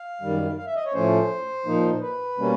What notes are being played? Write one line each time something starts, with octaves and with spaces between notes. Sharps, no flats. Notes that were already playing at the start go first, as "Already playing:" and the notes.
Already playing: F5
F#2 D#3 G3
F5
E5
D#5
C#5
A2 F3 A3 C#4 C5
A#2 F3 A#3 D#4
B4
B2 G3 A#3 C#4